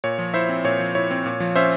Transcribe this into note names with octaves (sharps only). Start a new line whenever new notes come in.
A#2 C#5
F3
E4 C5 E5
C4
A#2 C#5
F3
E4 C#5
C4
A#2
F3
C#4 C5 E5